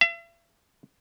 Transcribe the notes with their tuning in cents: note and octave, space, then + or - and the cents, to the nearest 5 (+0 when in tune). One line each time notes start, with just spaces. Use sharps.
E5 +40